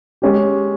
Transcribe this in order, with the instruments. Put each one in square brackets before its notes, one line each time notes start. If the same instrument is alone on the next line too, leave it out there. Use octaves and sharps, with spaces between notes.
[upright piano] G#3 C#4 G4